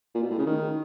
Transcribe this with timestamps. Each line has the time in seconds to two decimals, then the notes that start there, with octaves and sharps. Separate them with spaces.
0.15 A#2
0.23 B2
0.31 A2
0.38 C#3
0.46 D#3